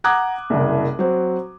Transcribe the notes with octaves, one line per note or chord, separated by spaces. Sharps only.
F#5 A#5 D6 D#6 F#6 G#6
F#1 C2
F#3 C4